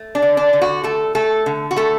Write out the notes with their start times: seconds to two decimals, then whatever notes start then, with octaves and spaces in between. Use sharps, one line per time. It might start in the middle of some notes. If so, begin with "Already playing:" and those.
Already playing: A3
0.15 D4
0.22 D3
0.37 D4
0.53 D3
0.61 F#4
0.84 A3 A4
1.15 A3 A4
1.46 D3
1.71 F#4
1.77 A3 A4